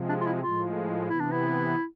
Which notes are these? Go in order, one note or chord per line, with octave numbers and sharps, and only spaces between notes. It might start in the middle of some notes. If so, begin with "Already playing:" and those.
Already playing: C3 F3 G#3
D4
F4
E4
A2 F3 G#3 F4
C3 E3 B3 E4
D4
E4